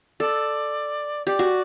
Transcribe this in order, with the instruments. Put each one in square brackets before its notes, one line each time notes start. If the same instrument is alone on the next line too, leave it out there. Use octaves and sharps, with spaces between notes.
[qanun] A4 [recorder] D5
[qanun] G4 [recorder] D5
[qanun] F#4